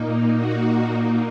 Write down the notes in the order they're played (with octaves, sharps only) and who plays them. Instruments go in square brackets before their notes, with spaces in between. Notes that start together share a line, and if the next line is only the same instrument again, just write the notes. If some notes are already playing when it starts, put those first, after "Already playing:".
Already playing: [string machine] A#2 A#3 D#4
F#4